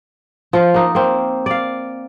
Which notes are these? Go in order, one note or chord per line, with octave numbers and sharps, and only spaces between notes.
F3 F4
A#3 D#4
A#3 C4
D5 F5